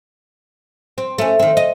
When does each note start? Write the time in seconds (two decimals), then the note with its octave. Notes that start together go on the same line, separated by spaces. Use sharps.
0.98 C4
1.18 A3 C#4
1.40 D#3 C4
1.57 D#5